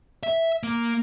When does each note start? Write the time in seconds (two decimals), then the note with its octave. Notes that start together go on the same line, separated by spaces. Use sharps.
0.23 E5
0.63 A#3